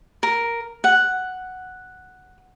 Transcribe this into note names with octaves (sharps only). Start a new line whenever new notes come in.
A#4
F#5